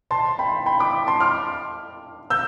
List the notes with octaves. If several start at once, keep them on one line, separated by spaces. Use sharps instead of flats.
A5 C6
G5 B5
G5 B5
B5 D6
A5 C6
D6 F6
E6 G6